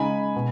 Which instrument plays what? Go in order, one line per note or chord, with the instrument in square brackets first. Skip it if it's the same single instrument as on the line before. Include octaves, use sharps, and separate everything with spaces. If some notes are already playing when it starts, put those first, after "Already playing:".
Already playing: [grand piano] C#3 G#3 D#4 [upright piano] G#5 B5
[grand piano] B2